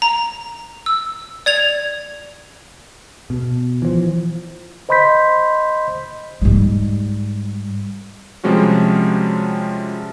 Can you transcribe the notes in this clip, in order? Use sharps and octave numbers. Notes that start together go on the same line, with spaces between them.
A#5
E6
D5 G#6 F7
B2
E3 F3
C5 D#5 B5 C6 G6 B6
G#2 G3
C3 F3 G3 G#3 C#4 F#4